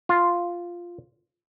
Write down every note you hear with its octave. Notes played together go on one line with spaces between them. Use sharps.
F4